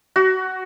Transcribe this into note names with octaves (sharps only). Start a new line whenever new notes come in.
F#4